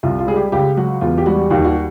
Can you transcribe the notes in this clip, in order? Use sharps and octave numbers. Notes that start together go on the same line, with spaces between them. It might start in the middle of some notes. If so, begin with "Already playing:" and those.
C2 F4
F4
G3 G#4
G4
C#2 G4
F#3 F#4
E2 F4
G4
G3 F#4
D#2 F#4
F#4